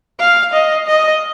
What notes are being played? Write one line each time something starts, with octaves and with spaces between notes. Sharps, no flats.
F5
D#5
D#5